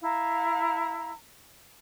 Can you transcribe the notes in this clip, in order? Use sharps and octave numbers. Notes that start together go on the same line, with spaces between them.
E4 F5 A#5